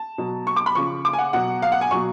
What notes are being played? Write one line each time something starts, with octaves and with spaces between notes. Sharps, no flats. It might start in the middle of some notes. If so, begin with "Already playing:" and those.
Already playing: A5
B2 F#3
C#6
D6
B5
C#3 F3 C#6
D6
G#5
F#5
B2 F#3 F#5
F5
F#5
G#5
B2 F#3 C#6